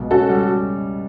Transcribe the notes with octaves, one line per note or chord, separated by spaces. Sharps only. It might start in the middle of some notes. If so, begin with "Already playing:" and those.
Already playing: C#2 B2 A3
C#4 F#4 A4
G3